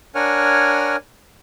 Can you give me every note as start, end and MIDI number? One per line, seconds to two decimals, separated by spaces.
0.15 0.96 62
0.15 0.96 70
0.15 0.96 73
0.15 0.96 78
0.15 0.96 80
0.15 0.96 89